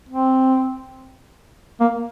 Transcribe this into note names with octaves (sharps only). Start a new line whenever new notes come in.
C4
A#3